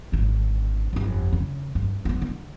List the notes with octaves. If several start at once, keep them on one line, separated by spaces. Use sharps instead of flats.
G#1 D3
G1 F2
C#3
G2
A#3 B3
D3